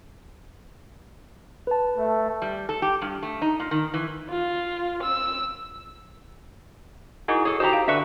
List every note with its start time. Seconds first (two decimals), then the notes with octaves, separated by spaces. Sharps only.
1.67 B4 A5
1.97 A3
2.42 G3
2.69 A4
2.82 G4
3.02 G2
3.23 A3
3.42 D#4
3.60 A#2
3.71 D#3
3.94 E3
4.29 F4
5.03 E6
7.28 D#4 E4 F#4 G#4 A#4
7.45 G#4 A4 C#5
7.60 D#4 F#4 G4 C5 A5 A#5
7.73 F5
7.88 D3 D4 B4 E5 C#6